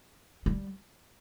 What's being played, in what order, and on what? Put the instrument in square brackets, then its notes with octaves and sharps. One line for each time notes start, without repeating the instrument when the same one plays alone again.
[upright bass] G3